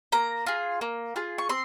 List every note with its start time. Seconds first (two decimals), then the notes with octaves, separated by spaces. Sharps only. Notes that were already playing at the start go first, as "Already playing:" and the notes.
0.12 A#3 A#5
0.46 F4 G#4
0.81 A#3
1.16 F4 G#4
1.38 C#6
1.49 C4 C6